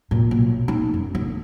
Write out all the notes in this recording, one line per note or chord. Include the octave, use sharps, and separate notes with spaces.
A#2
B1
D#4
F#2
D3